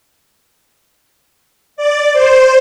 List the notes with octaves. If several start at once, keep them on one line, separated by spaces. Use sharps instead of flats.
D5
C5